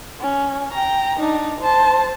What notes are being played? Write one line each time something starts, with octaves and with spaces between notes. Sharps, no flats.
C#4
G5 A#5
D4 D#4
C5 A5